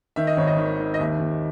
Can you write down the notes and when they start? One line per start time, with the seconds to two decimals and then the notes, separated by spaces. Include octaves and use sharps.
0.16 D#3 E5
0.27 D#5
0.37 G#1 C#5
0.47 D#5
0.58 D#3
0.79 D#3
0.94 D#5
0.99 D#2 E5
1.20 D#2